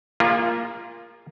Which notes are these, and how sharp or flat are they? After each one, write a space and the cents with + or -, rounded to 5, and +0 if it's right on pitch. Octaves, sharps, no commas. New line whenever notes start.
A#3 +0 F4 -10 G#4 -45